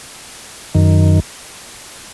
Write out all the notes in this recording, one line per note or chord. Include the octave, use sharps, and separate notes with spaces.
F#2 D#3